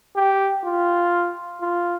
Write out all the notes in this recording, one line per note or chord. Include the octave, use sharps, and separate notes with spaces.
G4
F4
F4